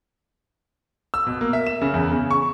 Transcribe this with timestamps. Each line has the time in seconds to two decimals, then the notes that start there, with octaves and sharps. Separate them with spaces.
1.14 E6
1.26 B2
1.41 A#3
1.53 E5
1.67 E7
1.81 C#3
1.94 E2
2.11 C#3
2.31 C#6